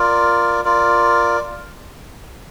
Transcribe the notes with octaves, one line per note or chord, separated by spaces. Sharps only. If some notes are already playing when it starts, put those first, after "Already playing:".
Already playing: F4 A#4 D5
F4 A#4 D5